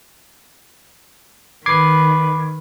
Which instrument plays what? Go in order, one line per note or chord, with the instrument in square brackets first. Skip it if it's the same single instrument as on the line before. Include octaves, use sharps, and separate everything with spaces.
[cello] D#3 [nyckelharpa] B4 [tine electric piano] D6 G#6 C7